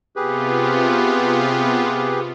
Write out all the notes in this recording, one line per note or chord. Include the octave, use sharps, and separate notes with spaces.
C3 B3 F4 G4 G#4 B4